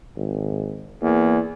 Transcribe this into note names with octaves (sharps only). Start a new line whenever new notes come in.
G#1
E2 A#3